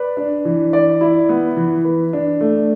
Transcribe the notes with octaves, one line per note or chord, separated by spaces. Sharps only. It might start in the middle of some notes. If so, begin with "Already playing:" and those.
Already playing: B4 D5
D4
E3
D5
E4
B3
E3
B4
D4
A3